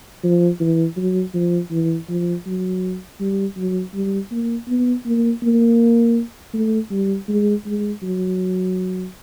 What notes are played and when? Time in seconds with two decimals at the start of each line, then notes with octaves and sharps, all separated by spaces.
0.24 F3
0.60 E3
0.97 F#3
1.34 F3
1.71 E3
2.09 F3
2.46 F#3
3.20 G3
3.56 F#3
3.94 G3
4.31 A#3
4.68 B3
5.05 A#3
5.43 A#3
6.53 A3
6.90 G3
7.28 G#3
7.66 G#3
8.02 F#3